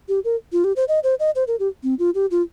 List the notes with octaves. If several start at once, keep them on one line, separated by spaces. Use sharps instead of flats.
G4
A#4
F4
G4
C5
D#5
C5
D#5
C5
A#4
G4
C4
F4
G4
F4